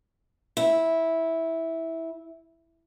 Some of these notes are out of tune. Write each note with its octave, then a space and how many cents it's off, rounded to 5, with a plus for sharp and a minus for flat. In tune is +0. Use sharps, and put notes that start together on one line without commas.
E4 -10